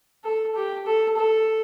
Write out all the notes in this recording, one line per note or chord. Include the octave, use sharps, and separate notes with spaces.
A4
G4
A4
A4